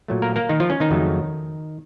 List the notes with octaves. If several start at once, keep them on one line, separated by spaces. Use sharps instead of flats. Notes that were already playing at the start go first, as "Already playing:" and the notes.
A#2 F#3 A3
A#3 A#4
A#3 A#4
D#3 D#4
F3 F4
C#4
D#3 D#4
F2 C#3 F#3 A3